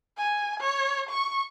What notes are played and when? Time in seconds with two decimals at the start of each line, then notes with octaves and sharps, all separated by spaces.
0.17 G#5
0.60 C#5
1.09 C#6